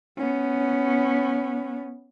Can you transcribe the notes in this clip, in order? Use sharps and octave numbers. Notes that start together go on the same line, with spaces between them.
B3 C#4